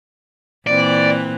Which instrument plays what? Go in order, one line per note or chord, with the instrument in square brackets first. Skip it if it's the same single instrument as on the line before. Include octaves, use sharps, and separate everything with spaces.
[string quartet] A#2 E3 C4 [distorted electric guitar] D5